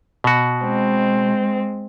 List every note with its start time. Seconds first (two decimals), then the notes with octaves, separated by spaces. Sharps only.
0.24 B2 F#4
0.62 G#3 C4